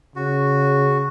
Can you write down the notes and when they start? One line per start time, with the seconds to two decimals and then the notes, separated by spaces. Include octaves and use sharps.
0.16 C#3 F#4